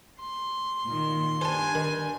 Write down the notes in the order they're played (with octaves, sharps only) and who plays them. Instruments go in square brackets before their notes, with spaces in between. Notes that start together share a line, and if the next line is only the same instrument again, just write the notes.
[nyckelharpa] C6
[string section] A#2 D#3
[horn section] G2 G3 G#5 [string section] D4 [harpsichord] C5 A5
[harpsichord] D#3